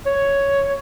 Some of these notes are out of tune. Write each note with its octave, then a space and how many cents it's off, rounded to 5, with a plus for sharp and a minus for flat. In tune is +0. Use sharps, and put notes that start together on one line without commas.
C#5 +5